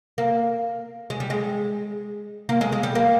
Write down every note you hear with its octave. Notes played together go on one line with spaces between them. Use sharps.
A#3
G#3
G3
G#3
A#3
G#3
G#3
G3
A#3